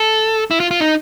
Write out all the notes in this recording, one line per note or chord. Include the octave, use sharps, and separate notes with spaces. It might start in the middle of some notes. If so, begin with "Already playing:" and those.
Already playing: A4
E4
F4
F4
D#4